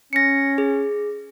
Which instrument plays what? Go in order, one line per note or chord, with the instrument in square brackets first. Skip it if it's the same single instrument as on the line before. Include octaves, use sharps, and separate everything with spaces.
[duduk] C#4 [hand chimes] A#6 C#7
[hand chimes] G#4